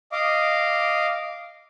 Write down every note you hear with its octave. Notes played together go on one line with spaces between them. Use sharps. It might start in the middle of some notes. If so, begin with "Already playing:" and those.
D#5 F5 D6